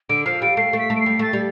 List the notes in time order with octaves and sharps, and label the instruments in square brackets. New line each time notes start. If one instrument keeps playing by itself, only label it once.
[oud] D3 [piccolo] D7
[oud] F3 [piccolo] C7
[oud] G3 [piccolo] D7
[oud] A3 [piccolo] C7
[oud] A3
[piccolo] B6
[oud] A3
[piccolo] D7
C7
[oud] G3
[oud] A3 [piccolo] A6
[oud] G3